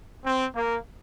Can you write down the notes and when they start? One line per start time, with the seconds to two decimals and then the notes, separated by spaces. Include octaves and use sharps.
0.25 C4
0.55 A#3